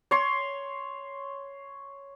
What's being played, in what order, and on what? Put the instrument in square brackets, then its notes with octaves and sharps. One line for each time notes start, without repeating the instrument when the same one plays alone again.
[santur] C#5 C6